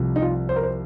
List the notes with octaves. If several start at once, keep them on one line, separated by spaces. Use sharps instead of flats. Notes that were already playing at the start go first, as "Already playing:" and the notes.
Already playing: C2 C3 F3
D#4
F4
C5
A#4
C5